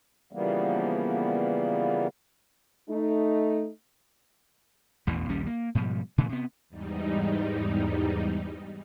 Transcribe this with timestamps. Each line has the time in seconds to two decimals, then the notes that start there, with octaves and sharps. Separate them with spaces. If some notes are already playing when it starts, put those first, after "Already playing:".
0.33 C#3 E3 F3 G3 A#3 B3
2.90 A3 D#4
5.07 A1 E2 B2 E3
5.29 A#1 D#2 G3 C#4
5.47 A#3
5.75 G#2 B2 F3 G3
6.18 A#2 C#3 E3 A3
6.29 C3 B3
6.69 E2 G#2 G3 D#4